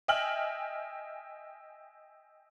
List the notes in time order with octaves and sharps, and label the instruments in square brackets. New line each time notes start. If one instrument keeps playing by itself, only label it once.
[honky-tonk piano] D#5 E5 G5 G#5 F6 F#7